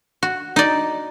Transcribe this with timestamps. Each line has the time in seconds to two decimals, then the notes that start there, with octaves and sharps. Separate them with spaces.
0.23 F#4
0.56 D#4 D5